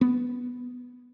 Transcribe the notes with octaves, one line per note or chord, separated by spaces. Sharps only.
B3